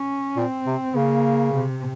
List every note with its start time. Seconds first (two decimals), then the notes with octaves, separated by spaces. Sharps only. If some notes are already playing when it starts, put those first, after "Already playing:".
Already playing: C#4
0.36 A#2 C4
0.67 C3
0.95 C#3 A#3
1.54 C3